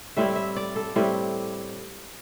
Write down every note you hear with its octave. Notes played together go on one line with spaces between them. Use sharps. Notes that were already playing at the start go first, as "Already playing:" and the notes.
A2 G3 C4 E4 E5
E5
D5
A4
A2 G3 C4 E4